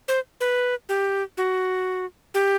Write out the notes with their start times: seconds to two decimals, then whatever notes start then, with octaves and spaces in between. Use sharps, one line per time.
0.08 C5
0.41 B4
0.89 G4
1.37 F#4
2.34 G4